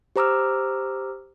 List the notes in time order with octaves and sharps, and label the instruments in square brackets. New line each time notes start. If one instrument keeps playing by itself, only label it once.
[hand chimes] G4 C5 A#5 D6 E6 F6